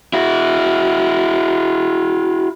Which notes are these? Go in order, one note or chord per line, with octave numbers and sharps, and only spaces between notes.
E4 F#4